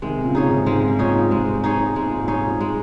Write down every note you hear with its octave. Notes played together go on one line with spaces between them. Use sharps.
C3 D#3 G#3
A#2 C#3
D#4 G#4 C#5
G#2 C3
G#2 C3 G#3
A#2 D#4 G#4 C#5
A#2
G#2 C3 G#3
D#4 G#4 C#5
G#2 G#3
A#2
G#2
A#2 D#4 G#4 C#5
A#2
G#3